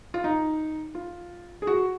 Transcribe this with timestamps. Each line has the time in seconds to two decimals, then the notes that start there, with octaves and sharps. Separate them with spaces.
0.14 F4
0.24 D#4
0.95 F4
1.62 G#4
1.67 F#4